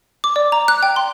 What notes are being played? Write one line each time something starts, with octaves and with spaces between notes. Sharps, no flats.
D6
D5
A#5
F#6
G5
C6